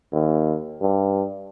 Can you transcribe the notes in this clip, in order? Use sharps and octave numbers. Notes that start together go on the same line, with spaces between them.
D#2
G2